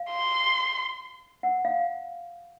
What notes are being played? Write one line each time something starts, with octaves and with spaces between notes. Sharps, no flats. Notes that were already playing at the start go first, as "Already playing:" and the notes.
Already playing: F5
C6
F#5
F5